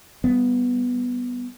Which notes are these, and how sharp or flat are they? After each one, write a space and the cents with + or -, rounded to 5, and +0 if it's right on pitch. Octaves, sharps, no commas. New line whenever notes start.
G3 +0 B3 +0